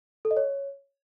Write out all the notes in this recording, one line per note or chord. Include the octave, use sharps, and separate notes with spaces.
A4
D#5
C#5